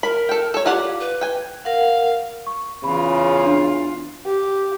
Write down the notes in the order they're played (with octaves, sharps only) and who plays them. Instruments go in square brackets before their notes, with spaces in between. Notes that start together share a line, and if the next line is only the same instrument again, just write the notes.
[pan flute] A#4 [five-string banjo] B5
[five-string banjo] A4 G5
A4 C#5
[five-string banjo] F4 D5 F#5 [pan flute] G4
[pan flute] B4
[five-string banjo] G5 G#5
[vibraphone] A#4 F#5 [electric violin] F5
[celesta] C#6
[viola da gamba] E2 F4 [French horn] C#3 [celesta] B5
[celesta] D4
[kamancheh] G4